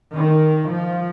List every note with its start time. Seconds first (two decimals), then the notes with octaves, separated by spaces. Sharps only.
0.15 D#3
0.70 F3